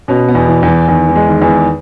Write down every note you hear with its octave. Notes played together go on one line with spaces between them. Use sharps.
B2 C#4
B3
E2
E3
E2
E3
E2 D#3
E3
G#3
D#3
E2
D#3